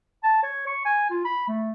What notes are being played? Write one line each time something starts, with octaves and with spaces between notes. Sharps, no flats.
A5
C#5
C#6
G#5
F4
B5
A3